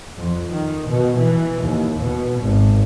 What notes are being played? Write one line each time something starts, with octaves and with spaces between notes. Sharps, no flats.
F2
D#3
B2
E3
D#2
B2
G#1